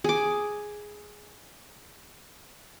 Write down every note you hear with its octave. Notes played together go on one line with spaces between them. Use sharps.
G#4 D6